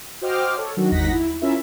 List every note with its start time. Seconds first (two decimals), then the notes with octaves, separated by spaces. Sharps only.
0.22 F#4 C5 D#5 G5 D6 F6
0.56 A4 C#5
0.76 D#3 F#3 D4 F#4
0.91 G1 D#2 D#4 F#5 A#6 B6
1.12 E4
1.42 C#4 E4 F4 A#4 E5